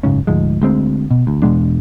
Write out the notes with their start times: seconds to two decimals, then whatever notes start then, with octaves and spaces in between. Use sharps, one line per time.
0.03 F#1 C#2 G#2 C#4
0.27 D2 G#2 F3 G#3
0.62 D2 G#3 C4
1.11 B2
1.27 D2
1.42 E2 B2 G#3 D4